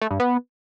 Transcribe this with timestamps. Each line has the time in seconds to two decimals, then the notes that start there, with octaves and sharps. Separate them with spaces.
0.02 A3
0.11 G2
0.20 B3